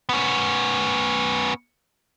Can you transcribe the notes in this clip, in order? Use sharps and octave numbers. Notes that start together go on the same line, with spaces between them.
B3 C#4